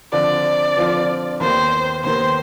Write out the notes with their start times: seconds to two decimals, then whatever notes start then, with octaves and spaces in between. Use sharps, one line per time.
0.12 D3 F3 C4 F4 D5
0.76 D3 F3 C4 F4
1.40 D#2 D#3 B3 C5
2.04 D#2 D#3 B3 C5